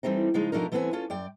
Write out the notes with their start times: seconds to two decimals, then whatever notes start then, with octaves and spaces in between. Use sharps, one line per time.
0.03 E3 G3 A3 C4 D#4
0.34 C#3 F3 G#3 D#4 F4
0.52 B2 F3 A3 D4 D#4 A#4
0.72 E3 A3 B3 C4 B4 G#5
0.93 C#4 F4 A4
1.10 F#2 D5 G5